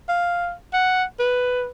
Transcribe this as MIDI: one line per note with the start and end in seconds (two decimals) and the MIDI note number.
0.09 0.53 77
0.74 1.04 78
1.20 1.68 71